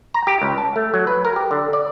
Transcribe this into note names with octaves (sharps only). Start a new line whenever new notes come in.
A#5
G4
C#2
A5
A3
F#3
B4
A#4
G4
D3
D5